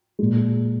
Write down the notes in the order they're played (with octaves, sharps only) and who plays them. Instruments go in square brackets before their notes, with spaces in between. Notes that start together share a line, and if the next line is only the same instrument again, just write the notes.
[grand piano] A#2 G#3